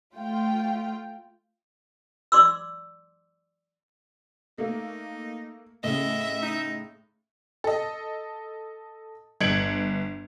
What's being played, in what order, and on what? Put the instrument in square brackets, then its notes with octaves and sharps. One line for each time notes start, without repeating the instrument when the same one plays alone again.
[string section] A3 F4 G5
[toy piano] D5 C6 D6 E6
[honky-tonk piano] A3 A#3 [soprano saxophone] D#4
[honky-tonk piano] A2 C#3 [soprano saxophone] D#5 [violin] E5
[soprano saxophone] D#4
[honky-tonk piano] A4 D#5
G1 G#6 C#7 D7 F#7